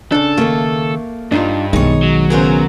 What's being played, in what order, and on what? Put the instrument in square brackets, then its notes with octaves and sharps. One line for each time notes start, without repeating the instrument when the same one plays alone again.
[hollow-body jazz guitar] C#3 D4 [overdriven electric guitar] A4
[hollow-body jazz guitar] D#2 G#2 C#3 [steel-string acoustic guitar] A3 A#3
[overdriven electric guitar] G2 [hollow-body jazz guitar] D4 D#4 F4
[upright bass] B1 D#3 [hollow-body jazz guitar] G#3 [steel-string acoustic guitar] D#4 C#5
[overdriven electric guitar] F#3
[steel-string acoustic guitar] C#3 B3 A#4 [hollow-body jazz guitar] G#4 C5